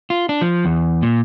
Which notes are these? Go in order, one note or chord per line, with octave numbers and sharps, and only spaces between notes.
F4
D4
F3
E2
A#2